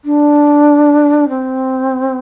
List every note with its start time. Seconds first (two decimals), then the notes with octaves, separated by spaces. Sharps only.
0.05 D4
1.29 C4